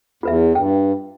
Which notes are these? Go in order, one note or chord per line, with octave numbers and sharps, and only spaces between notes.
E2 F4 B4 E5
G2 G5